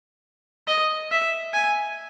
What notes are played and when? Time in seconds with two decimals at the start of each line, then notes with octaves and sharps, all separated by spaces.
0.67 D#5
1.11 E5
1.53 G#5